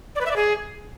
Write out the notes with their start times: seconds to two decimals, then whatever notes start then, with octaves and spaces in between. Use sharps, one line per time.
0.15 D5
0.21 B4
0.26 E5
0.31 D5
0.36 G#4